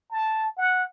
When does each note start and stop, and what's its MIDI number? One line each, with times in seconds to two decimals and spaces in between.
0.11 0.48 81
0.57 0.83 78